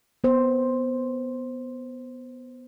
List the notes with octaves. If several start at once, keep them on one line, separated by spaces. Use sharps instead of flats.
B3 C5